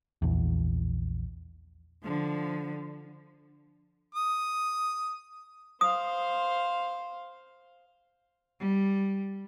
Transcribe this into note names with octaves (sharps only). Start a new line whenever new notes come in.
A#1 E2
D3 F3
D#6
C5 F5 D#6
G3